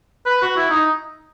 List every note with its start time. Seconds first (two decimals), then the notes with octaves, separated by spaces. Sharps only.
0.26 B4
0.42 F#4
0.57 E4
0.70 D#4